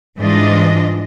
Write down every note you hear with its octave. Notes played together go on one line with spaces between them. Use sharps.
G#2 E3 G3 D4 F4 D#5